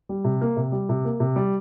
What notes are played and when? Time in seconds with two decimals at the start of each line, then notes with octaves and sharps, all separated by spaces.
0.09 G3
0.24 C3
0.41 A#3
0.56 C3
0.72 G3
0.89 C3
1.05 A#3
1.20 C3
1.36 G3